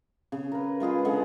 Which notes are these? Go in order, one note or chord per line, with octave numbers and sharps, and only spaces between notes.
C#3
A#4 B4
G#3 F4 G#4 B4
D3 G#3 F#5